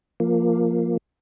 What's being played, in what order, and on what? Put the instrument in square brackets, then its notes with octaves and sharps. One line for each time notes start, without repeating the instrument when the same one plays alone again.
[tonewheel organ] F3 A#3